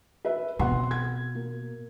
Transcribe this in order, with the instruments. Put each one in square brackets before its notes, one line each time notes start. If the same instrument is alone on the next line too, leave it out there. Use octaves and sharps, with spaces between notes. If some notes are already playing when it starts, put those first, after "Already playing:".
[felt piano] B4 E5
[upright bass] B2 [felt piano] C4 F#5 C6
[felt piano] G#6
A#3